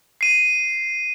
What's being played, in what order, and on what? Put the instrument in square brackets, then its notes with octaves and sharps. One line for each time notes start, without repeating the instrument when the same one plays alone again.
[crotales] C7 D#7